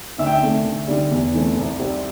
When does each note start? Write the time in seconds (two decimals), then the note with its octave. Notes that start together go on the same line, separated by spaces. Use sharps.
0.18 D2 E5
0.26 G5
0.34 E5
0.42 C3 A3
0.65 D2
0.88 D3 G3
1.11 E2
1.33 E3 A3 C4
1.56 C2
1.79 C3 G3 C4